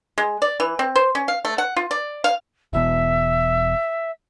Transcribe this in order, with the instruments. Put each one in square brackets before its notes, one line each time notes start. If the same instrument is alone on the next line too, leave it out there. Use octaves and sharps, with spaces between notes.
[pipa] G#3
D5
E3
C4
C5
C#4
F5
A3
F#5
F4
D5
F5
[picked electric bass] E1 E2 B2 [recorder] E5